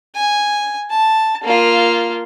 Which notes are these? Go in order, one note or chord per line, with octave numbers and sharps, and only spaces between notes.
G#5
A5
A#3 F4